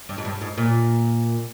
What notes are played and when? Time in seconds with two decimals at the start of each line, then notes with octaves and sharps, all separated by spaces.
0.09 G2
0.18 G#2
0.25 G2
0.41 G#2
0.58 A#2